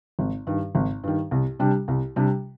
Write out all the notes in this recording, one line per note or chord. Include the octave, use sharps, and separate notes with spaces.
G#1
G2 D#3
G#1
G2 D#3
C2
C3 G3 D4
C2
C3 G3 D4